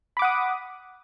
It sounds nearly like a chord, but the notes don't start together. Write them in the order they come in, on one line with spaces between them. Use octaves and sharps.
B5 D6 F#5 D#6